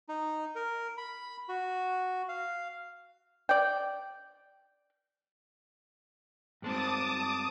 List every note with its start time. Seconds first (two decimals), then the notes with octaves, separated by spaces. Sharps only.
0.09 D#4
0.55 A#4
0.97 B5
1.49 F#4
2.29 F5
3.49 D5 G5
6.62 G2 G#3 C4 A5 D6 D#6